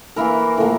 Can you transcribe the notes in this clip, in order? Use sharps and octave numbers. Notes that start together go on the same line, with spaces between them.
E3 A#3 E4 A#4
A2 F3 A#3